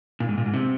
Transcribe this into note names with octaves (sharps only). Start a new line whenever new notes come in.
A#2
G#2
A#2
G#2
C3